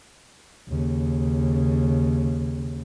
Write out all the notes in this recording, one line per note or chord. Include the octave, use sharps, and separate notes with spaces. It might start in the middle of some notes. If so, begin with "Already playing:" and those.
D#2 C#3